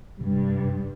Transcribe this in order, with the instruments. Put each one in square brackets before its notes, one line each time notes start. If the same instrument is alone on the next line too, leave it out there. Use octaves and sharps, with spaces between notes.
[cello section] G2 [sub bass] C3